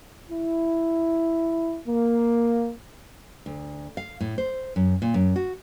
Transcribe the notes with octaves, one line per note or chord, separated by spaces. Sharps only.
E4
A#3
D2
F5
A2
C5
F#2
A#2
F#2
F#4